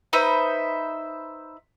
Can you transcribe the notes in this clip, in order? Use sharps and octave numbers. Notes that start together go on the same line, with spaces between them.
D#4 B4 C5 E5